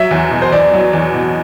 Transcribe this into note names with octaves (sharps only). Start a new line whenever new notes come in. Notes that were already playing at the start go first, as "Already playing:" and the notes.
Already playing: F#3 E5
E2
B2
C5
E2 D5
F#3
E2
B2